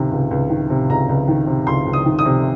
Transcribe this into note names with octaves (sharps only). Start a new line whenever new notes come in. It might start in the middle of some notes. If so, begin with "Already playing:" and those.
Already playing: C#2 C3 D#3
C#2
C#2
D#3
C3
C#2 A#5
C#2
D#3
C3
C#2 C6
C#2
D#6
D#3
D#6
C3